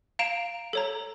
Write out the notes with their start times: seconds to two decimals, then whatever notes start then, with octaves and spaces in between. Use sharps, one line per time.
0.19 F5 A#5 D7 E7 F7
0.73 A4 C#5 A#5